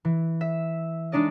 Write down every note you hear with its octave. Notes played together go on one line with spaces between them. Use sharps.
E3
E5
G#3 D4 D#4 D5 D#5